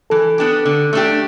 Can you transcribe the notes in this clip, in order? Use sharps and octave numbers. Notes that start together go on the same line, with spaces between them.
E3 A4
B3 D4 G4
D3
A3 D4 G4